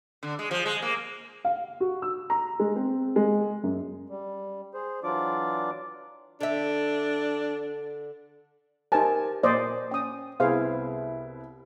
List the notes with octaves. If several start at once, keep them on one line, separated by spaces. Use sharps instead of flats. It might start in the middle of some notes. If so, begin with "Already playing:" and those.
D3
G#3
F3
G#3
A#3
F5
F#4
E6
A#5
G#3
C4
G#3
F#2
G3
G#4 C5
E3 F#3 D4 F4 D5 D6
D3 D4 E5
D#4 G4 A#4 C5 G#5 A5
A#2 C5 D5 D#5
C#4 G5 D#6
C2 B3 E4 G#4 C5 F5